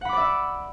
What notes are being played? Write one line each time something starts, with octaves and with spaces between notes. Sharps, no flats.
D5 E5 F#5 B5 D6